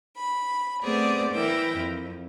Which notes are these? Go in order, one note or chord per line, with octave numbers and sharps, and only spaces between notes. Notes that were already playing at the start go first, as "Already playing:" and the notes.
B5
A3 B3 C4 G#4 C5 D5
E3 E4 A#4 G5
F2